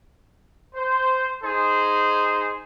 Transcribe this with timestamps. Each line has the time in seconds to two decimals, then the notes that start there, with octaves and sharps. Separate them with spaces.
0.75 C5
1.44 D#4 G#4 C5